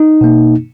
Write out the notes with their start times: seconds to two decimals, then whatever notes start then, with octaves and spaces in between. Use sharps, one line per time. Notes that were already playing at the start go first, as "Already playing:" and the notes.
Already playing: D#4
0.21 B2 A#3